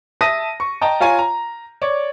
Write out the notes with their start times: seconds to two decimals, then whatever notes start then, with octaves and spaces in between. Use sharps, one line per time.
0.21 E5 A5 D#6 A#6 D#7
0.60 C#6
0.81 D#5 G5 A5 A#5
1.01 F4 C#5 F5 G#5 A#5
1.19 A#5
1.82 C#5 D5